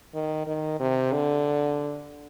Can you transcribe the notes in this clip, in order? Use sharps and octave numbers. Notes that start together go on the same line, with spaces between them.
D#3
D#3
C3
D3